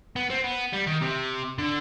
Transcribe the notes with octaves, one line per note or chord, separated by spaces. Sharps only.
B3
C4
B3
G3
D#3
C3
D3